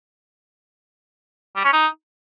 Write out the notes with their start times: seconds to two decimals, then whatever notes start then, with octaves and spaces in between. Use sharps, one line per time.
1.56 G3
1.65 C#4
1.73 D#4